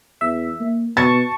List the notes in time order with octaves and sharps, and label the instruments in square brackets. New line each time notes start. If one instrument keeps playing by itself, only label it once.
[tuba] E2 [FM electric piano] E5
[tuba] A#3
[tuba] B2 [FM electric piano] A5 C#6 [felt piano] A6